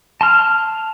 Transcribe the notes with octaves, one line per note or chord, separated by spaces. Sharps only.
A5 C6 F6